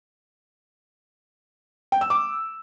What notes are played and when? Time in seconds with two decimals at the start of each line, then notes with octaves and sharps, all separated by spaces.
1.92 G5
2.01 E6
2.10 D6